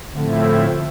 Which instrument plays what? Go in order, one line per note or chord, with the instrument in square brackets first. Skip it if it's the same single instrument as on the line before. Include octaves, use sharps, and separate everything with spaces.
[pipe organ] A2 F3 A3 C4 E4 [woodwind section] D3